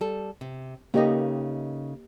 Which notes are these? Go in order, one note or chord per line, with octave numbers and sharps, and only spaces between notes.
G3 A4
C3
C#3 A3 A#3 D#4 G4 D#5